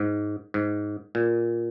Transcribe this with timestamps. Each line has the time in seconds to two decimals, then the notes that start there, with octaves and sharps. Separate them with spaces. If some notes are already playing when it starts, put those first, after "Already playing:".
Already playing: G#2
0.54 G#2
1.15 A#2